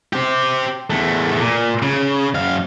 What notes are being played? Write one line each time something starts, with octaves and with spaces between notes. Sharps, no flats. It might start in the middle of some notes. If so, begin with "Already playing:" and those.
C4 G4
E2 A3
A#2
C#3
F#2 F5